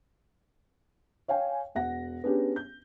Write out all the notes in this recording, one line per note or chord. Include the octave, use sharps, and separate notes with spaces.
C#5 F5 G5 G#5
E1 F#5 A#6
B3 C#4 D4 G4 G#4
G6